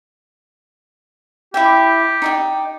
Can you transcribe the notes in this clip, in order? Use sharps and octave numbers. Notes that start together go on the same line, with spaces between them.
E4 G4 E5 G5
D#4 D5 G5